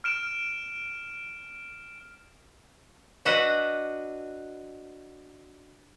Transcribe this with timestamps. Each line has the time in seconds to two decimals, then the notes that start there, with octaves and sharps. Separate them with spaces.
0.04 F6 D7 E7
3.25 D4 F#4 B4 D#5 E5 F#5